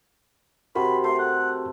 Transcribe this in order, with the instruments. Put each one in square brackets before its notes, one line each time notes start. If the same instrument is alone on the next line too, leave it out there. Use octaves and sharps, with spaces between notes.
[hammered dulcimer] C3 [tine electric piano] F#4 G4 A#4 [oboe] B5
[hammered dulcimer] A3 [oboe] C6
[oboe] F#5